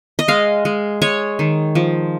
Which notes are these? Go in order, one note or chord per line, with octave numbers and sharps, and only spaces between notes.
D#5
G#3 F5
G#3
G#3 C#5
D#3
F3